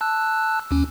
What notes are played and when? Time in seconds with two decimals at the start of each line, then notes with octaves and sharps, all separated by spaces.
0.01 A5 E6 F#6
0.71 D#2 C#4